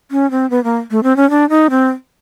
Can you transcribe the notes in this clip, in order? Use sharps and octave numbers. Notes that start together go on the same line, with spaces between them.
C#4
C4
B3
A#3
A3
C4
C#4
D4
D#4
C4